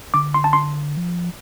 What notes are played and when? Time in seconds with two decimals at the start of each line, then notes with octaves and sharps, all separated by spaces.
0.14 D3 D6
0.34 C6
0.44 A5
0.53 C6
0.97 F3